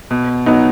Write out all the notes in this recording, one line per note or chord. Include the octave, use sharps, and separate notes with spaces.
B2
F#3 B3 D#4